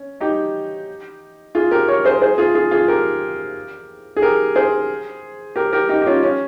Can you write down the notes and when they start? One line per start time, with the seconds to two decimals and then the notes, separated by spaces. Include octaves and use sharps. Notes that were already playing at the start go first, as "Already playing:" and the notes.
Already playing: C#4
0.21 D#4 G4
1.55 F4 G#4
1.71 G4 A#4
1.88 A#4 C#5
2.05 G#4 C5
2.21 G#4 C5
2.38 F4 G#4
2.55 F4 G#4
2.71 F4 G#4
2.88 G4 A#4
4.16 G#4
4.22 G4 A#4
4.56 G#4 C5
5.56 G4 A#4
5.73 G4 A#4
5.89 D#4 G4
6.02 G4
6.06 C#4 F4
6.23 C#4